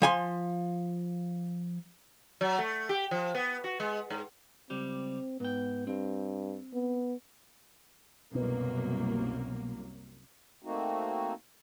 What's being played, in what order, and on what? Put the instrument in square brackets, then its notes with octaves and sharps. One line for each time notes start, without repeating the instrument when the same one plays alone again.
[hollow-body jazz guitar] F3 G#5 C6
[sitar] F#3
A3
G4
F3
B3
F#4
G#3
G#2
[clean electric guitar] C#2 G3 G4 [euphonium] C4
[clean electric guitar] G#2 G5 [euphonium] B3
[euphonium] G2 [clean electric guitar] C4
[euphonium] B3
[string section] C2 F#2 A#3 [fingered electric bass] B2
[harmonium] A3 A#3 C4 D#4 F#4